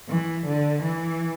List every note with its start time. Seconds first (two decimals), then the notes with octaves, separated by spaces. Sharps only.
0.09 E3
0.47 D3
0.83 E3